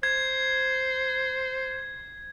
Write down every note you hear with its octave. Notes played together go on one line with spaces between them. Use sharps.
C5 G#6